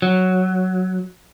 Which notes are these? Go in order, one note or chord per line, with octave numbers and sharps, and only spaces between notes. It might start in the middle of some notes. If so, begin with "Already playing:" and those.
F#3